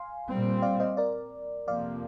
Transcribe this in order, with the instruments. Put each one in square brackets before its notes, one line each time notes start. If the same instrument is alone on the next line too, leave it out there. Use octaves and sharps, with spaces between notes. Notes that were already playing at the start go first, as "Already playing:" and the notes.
Already playing: [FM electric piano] F5 G#5 C6
[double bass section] A#2 G3 C4
[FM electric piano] D5 F5
C5 D#5
A#4 D5
[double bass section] F2 C3 F3 A#3 [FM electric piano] D5 F5